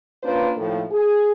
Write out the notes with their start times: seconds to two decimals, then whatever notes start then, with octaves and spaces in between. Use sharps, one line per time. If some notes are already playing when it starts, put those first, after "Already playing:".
0.23 A#3 C#4 D4 F4 B4 C5
0.56 A2 D#3 F3 A3 A#3
0.91 G#4